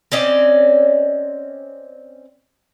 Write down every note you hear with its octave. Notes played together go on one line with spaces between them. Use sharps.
C4 C#4 D5 D#5